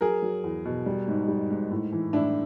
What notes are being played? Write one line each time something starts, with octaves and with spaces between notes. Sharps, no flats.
F#3 G#4 A#4
F#3
E2
B2
G3
G#2
G3
G#2
A2
E3
A2 D4 E4